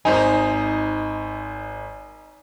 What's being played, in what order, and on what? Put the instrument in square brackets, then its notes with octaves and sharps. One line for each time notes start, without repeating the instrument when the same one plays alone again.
[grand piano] G#1 C5 G#5 [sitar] D#4